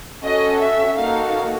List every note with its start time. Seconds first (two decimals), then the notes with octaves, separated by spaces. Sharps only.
0.23 C#4 F#4 A4 D#5
0.60 E5
0.97 A#3 D#4 F#4 A4 F5